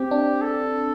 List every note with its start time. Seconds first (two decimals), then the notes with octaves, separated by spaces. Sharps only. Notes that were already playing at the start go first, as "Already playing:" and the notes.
Already playing: C4 G4
0.11 D4
0.42 A4